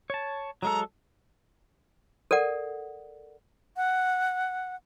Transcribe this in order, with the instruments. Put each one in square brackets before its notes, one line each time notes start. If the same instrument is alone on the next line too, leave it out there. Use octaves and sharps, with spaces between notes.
[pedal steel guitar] C#5 A5
[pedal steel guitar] F#3 G#3 A4 [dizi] A#5
[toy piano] A4 A#4 D5 F#5
[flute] F#5